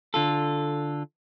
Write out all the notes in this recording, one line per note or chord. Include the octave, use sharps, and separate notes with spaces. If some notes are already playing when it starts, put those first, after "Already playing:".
D3 F4 A4